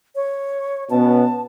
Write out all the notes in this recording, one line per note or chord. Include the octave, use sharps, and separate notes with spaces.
C#5
B2 B3 C#4 A5